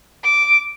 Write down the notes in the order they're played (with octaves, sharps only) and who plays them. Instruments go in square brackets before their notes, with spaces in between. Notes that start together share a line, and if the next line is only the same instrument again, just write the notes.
[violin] D6